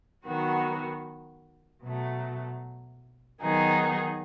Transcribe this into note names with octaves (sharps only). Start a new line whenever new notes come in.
D#3 F#3 B3 F#4
B2 F#3 A3
D#3 F#3 B3 D#4 G#4